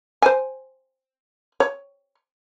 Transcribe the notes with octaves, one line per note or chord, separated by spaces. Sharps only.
C5 G#5
C#5